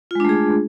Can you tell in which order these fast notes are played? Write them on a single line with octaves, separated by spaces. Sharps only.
F4 G#3 D4 A3 G#4